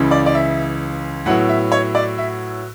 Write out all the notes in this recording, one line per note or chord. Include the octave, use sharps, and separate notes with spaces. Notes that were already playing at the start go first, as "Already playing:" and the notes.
Already playing: C#2 C#3 E3
D5
D5
E5
A2 F#3 B3 E4 F#5
E5
C#5
D5
E5